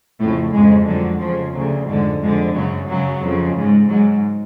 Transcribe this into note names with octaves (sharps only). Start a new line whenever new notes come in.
F2 A2 C#3 A3
F2 G#2 C#3 G#3
F2 D3 F#3
F2 C#3 F3
D2 C#3 F#3
F2 G#2 D3 G#3
F2 G#2 D3 G#3
F#2 C#3 F#3
F#2 C#3 F#3
F2 C#3
G#2
G#2 F#3